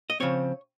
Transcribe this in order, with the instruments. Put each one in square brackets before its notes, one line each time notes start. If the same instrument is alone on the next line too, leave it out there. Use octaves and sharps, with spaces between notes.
[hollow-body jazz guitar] D#5
C#3 F3 C4 C#5